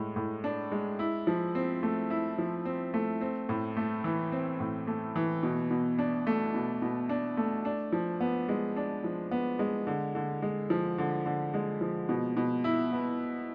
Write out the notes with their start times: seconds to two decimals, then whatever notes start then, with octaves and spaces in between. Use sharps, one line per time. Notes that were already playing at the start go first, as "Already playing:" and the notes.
Already playing: A2 G#3
0.16 A2
0.44 D4
0.72 G#3
0.99 E4
1.27 F3
1.55 C4
1.83 A3
2.10 E4
2.38 F3
2.66 C4
2.94 A3
3.21 C4
3.49 A2
3.77 A3
4.04 E3
4.32 C4
4.60 A2
4.87 A3
5.16 E3
5.43 B2
5.71 B2
5.99 D4
6.27 A3
6.54 B2
6.82 B2
7.09 D4
7.37 A3
7.65 D4
7.92 F3
8.20 B3
8.49 G#3
8.77 D4
9.04 F3
9.31 B3
9.59 G#3
9.87 D3
10.15 D3
10.42 G#3
10.70 F3
10.98 D3
11.26 D3
11.54 G#3
11.81 F3
12.09 B2
12.37 B2
12.64 E4
12.93 B3